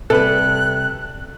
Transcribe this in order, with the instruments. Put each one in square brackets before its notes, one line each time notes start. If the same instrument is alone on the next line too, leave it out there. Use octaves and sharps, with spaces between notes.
[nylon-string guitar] C3 G3 [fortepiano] A4 B4 [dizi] F#6